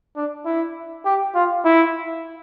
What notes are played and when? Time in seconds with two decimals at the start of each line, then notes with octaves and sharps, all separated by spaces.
0.16 D4
0.45 E4
1.05 G4
1.35 F4
1.65 E4